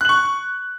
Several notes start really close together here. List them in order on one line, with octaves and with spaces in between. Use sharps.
F#6 F#7 C#6